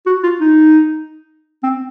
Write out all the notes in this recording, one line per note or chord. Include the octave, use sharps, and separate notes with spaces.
F#4
F4
D#4
C4